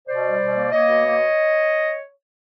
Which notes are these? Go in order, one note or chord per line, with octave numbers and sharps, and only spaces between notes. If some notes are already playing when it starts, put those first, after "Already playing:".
B2 C5 D5
G3
B2
A#3
A#3 C#5 D#5
B2
A#3